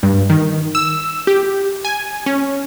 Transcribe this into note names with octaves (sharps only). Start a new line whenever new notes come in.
G2
D#3
E6
G4
G#5
C#4